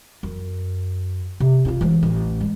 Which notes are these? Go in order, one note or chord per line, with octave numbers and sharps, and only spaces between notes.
F#2
C3
G2 F4
E3 G#3
A1
G#3